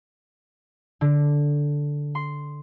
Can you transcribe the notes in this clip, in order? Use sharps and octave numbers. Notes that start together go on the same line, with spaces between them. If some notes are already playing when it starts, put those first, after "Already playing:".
D3
C6